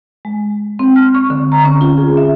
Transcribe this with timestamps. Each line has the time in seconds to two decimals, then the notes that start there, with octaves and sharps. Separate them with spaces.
0.25 G#3
0.79 C4
0.96 F6
1.15 C#6
1.30 D3
1.52 A#5
1.65 C#4
1.81 F4
1.98 G#4
2.17 E5